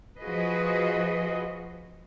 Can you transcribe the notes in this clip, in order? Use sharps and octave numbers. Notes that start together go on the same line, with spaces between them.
F3 F#4 G#4 B4 D#5